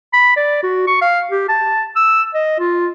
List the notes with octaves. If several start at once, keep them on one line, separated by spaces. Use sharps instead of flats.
B5
D5
F#4
C#6
F5
G4
A5
E6
D#5
F4